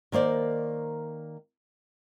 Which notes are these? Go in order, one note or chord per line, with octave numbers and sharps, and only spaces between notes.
D#3 A#3 C5 D5